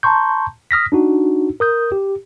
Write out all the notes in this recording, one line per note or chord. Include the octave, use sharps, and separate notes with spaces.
A5 A#5 C6 C#6 G6
D#6 F6 A#6 B6
D4 D#4 F#4
A#4 D#6 G6
G4